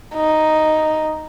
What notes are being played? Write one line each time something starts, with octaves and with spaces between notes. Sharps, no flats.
D#4